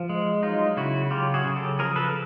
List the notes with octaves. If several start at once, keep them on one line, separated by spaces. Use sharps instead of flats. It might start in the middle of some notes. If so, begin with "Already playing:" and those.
Already playing: F3
G#3
F#3 D#4 F4
C#3 E4 F#4
F#3 F4 G4
F#4 G#4
C#3
G4 A4
F3 G#4 A#4
A4 B4